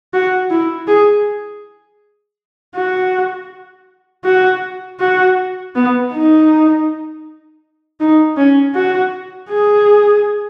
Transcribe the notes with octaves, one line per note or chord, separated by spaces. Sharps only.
F#4
E4
G#4
F#4
F#4
F#4
B3
D#4
D#4
C#4
F#4
G#4